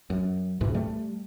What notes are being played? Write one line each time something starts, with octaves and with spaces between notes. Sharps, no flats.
F#2
C#2 G#2 B2 E3
G3 A3